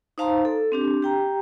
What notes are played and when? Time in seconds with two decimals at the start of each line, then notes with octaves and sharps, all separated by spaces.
0.18 D#4 C5 F5 A5 A#5 C6
0.45 A4
0.72 C4 D4 G4
1.02 G4 G5 A#5